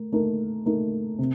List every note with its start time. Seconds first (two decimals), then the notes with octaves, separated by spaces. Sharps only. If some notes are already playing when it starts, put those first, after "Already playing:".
Already playing: A3 A#4
0.12 A3 D#4 A#4
0.66 A3 D#4 A#4
1.18 C3